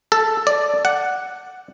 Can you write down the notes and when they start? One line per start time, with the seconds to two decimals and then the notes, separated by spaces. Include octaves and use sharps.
0.12 A4
0.47 D5
0.85 F#5